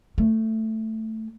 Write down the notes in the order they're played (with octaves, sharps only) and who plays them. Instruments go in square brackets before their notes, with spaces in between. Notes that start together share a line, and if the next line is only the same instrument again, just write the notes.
[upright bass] A3